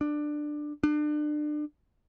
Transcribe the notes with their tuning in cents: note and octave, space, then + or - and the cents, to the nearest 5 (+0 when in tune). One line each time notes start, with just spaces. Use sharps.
D4 +15
D4 +30